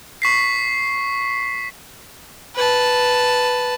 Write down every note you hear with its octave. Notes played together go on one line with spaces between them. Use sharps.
C#6 B6 C7
B4 A5